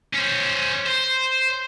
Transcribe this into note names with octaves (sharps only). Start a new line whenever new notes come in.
C#4 C5
C5